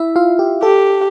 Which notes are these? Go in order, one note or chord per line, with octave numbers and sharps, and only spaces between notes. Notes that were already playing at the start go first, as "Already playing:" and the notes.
Already playing: E4 E5
F4 F5
G4
G4 A4